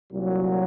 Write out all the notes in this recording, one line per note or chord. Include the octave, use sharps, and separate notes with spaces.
C2 A#2 F#3